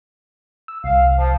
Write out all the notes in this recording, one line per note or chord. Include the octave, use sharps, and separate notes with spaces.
E6
C2 F5
F3